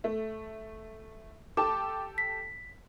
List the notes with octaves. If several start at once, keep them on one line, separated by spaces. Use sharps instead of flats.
A3
G4 A4 A5 D6
B6